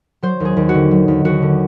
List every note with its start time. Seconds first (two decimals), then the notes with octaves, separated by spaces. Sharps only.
0.23 F#3 C5
0.40 D#2 G#4
0.57 D#2
0.69 F#4
0.75 D3
0.91 F#3
1.08 D#2
1.25 D#2 F#4
1.42 D3